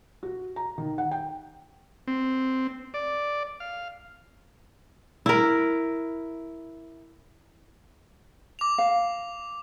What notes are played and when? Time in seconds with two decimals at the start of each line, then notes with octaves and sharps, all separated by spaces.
0.23 F#4
0.56 A#5
0.78 D#3
0.98 F#5
1.11 G5
2.07 C4
2.94 D5
3.60 F5
5.26 E4 A#4
8.59 D6 F7
8.78 F5